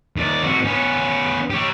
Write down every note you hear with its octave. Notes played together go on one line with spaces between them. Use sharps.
D#2 D5
C4 F#4
B3 C#4
G4 C#5